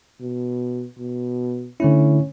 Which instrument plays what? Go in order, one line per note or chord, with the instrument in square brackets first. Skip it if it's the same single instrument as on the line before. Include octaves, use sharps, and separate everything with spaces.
[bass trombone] B2
B2
[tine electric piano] D3 A3 E4 [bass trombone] C#4